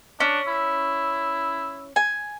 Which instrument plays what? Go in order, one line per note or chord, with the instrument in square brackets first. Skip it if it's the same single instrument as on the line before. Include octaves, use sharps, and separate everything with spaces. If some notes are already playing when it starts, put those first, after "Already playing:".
[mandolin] C#4 [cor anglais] D4
[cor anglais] E4
[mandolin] G#5